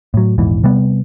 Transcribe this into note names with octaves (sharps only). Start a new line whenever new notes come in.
A2 F#3
A#1 E2 G#2 E3
C3 G3 B3